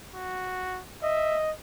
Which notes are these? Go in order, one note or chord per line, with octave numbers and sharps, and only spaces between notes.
F#4
D#5 E5